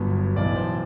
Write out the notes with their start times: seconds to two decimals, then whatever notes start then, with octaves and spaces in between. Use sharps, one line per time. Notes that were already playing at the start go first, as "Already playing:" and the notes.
Already playing: G1 G2 F#3 B3
0.36 B1 A2 E3 D5
0.56 C5